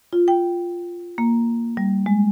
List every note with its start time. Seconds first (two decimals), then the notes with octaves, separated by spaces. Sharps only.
0.13 F4
0.28 G5
1.18 A#3
1.77 G3
2.06 G#3